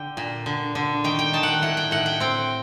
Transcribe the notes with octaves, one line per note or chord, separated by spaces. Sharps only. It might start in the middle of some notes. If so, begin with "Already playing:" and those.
Already playing: D3 G5
A#2
D3
D3
D#3 G5
G5
D#3 A5
F#5 G5
A2 F#5
G5
A2 F#5
G5
C4 G5